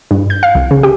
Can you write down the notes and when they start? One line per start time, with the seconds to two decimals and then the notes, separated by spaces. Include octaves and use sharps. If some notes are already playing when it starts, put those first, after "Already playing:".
0.11 G2
0.30 G6
0.43 F5
0.55 C2
0.71 C#3
0.83 G4